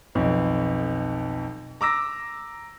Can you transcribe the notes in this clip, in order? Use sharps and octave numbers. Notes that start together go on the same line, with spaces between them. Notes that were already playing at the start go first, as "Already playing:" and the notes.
B1 F2
A#5 D6 E6 A#6